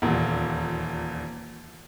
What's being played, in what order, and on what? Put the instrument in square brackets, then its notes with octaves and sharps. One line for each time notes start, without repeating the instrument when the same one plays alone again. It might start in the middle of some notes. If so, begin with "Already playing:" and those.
[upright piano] D#1 E2 A#2